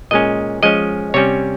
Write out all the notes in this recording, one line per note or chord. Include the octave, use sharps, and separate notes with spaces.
A#2 G#3 C#4 D#5
F3 G#3 C#4 D#5
C3 G3 C#4 C#5